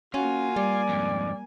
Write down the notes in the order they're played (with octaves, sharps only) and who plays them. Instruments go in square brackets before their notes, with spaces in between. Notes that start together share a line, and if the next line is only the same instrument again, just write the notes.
[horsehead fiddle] A#3 G#5 [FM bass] C#4 [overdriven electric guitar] F4 [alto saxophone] F#4
[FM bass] G3 [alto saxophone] D5
[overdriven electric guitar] F2 G#2